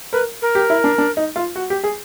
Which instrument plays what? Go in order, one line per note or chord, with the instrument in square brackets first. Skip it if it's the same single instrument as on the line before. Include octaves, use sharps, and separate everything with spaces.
[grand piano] A#4 [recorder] B4
[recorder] A#4
[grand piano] G4
E4
D4
D4
D#4
F4
F#4
G4
G#4